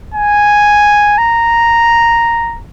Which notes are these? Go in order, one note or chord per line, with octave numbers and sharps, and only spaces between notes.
G#5
A#5